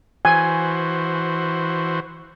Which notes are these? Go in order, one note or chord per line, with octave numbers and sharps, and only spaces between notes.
E3 F#4 C5 G#5